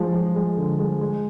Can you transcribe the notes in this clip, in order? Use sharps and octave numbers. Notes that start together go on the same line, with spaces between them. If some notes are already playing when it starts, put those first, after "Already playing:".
Already playing: F3 G#3
F3
G#3
D3
G#3
G#3